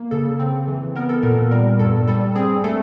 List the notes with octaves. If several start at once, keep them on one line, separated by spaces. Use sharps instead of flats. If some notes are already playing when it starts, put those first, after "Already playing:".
Already playing: A#3
C#3 A4
C4
E3
B3 A#4
A4
A#2 A#4
G3 A#4
G2 A4
G3 A4
C4 G#4
A3 A4